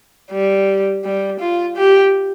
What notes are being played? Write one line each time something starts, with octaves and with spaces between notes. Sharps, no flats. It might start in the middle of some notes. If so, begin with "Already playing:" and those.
G3
G3
F4
G4